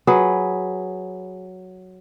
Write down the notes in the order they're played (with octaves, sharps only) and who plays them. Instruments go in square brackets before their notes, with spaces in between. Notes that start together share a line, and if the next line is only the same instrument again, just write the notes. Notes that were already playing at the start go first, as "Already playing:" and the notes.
[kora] F#3 G#4 B4